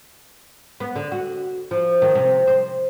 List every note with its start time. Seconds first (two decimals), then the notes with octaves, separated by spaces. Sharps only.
0.80 B3
0.96 D3
1.12 F#4
1.71 F3
2.02 D#3
2.15 C3
2.47 C5